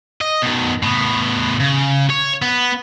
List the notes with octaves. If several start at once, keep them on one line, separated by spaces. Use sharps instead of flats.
D#5
B2 D#3
A2 B3
C#3
C#5
B3